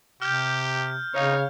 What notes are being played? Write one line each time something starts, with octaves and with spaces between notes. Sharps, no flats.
C3 G4 F6 G6
C#3 D#4 C#5 F5